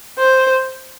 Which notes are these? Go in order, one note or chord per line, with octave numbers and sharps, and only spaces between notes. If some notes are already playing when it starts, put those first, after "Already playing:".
C5